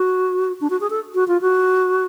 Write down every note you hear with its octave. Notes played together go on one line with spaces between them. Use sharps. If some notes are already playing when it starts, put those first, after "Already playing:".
Already playing: F#4
D4
F#4
G#4
A4
F#4
F4
F#4